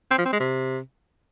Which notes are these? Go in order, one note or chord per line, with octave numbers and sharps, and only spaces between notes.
C4
F3
C4
G#3
C3